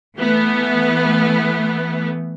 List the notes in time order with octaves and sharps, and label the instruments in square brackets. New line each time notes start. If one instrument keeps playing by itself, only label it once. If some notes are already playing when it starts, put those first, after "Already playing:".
[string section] E3 A3 B3